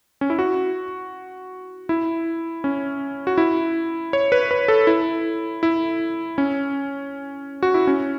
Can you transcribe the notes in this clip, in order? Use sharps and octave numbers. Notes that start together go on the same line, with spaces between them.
C#4
E4
F#4
E4
C#4
F#4
E4
C#5
B4
B4
A4
E4
E4
C#4
F#4
E4
C#4